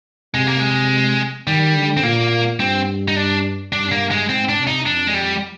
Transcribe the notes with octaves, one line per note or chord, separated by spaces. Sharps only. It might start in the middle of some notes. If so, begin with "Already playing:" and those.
C3 G#3
A#3
G#3
D#3 G3
D3
C4
A#2 A#3
G2 C4
D#4
D4
G2 D4
A#3
G#3
G#2 C4
D4
C3
D#4
F2 D4
G#3
G3